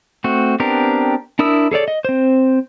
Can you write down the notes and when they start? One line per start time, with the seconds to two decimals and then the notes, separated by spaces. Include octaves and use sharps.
0.24 A3 C4 F#4
0.60 B3 C4 D4 G4 A#4
1.39 D4 E4 A#4 D#6 E6
1.72 G#4 A4 C#5 D5
1.88 D#5
2.05 C4 C5